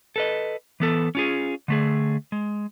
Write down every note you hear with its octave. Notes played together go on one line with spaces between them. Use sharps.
A4 B4 D#5
E3 B3 A4
C#4 F4 G#4
D3 A3 G#4
G#3